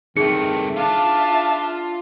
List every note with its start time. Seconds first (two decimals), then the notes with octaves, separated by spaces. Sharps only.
0.17 C2 D#3 A3 D#4 G#4 C#7
0.76 D4 F4 E5 F5 A5